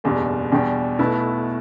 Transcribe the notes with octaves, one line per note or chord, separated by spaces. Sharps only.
F#1 E2 B2 G3 D4
E2 B2 G3 D4 G4
B1 B2 A3 E4 B4